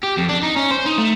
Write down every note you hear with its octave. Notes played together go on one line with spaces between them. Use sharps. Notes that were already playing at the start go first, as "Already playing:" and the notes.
G4
F2
D4
D#4
C#4
C5
D#4
A3